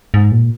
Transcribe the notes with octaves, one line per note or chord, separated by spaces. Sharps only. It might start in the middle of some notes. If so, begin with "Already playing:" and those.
G#2
A#2